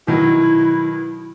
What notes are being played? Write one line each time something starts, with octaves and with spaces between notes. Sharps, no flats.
B2 D#3 F#3 E4